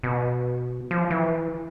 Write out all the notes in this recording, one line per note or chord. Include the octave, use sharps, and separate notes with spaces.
B2
F3
E3